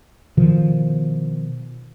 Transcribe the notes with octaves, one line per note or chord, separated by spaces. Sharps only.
B2 D#3 F3